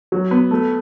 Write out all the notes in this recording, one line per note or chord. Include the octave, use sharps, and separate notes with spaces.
F#3
B3
A3